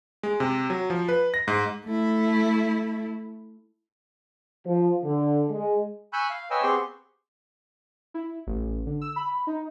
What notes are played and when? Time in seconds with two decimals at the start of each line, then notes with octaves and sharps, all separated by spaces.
0.23 G#3
0.40 C3
0.70 F#3
0.90 F3
1.09 B4
1.34 A#6
1.48 G#2
1.85 A3 E4
4.65 F3
5.04 D3
5.49 G#3
6.13 G#5 B5 C#6 E6 F#6 G6
6.30 F5
6.50 B4 C#5 D#5 G5 G#5 E6
6.62 B3 C4 G4 G#4 C6 C#6
8.14 E4
8.47 A1
8.86 D3
9.01 E6
9.16 B5
9.47 D#4